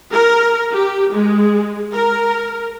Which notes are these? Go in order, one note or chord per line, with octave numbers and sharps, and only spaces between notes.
A#4
G4
G#3
A#4